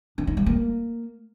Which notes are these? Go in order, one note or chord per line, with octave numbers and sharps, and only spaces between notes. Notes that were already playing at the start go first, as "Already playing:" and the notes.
D4
D#4
G3
A#3